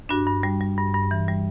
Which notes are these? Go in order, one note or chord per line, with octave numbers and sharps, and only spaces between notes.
G2 D4 F#4
G2
G3
G3
G2
G2
E3
G3